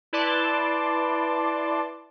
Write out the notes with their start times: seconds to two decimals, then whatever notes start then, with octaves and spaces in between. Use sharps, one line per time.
0.13 E4 B4 D5 A5 C6 D6